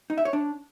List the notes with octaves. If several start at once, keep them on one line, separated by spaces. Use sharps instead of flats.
D#4
E5
C#5
D4